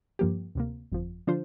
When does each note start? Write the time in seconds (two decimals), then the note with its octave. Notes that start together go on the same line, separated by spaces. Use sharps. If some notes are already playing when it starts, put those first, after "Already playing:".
0.19 G2 F3 A#3 G4
0.55 D2 C3 A#3
0.92 G1 F2 F3
1.27 D3 F3 D4 F4 C5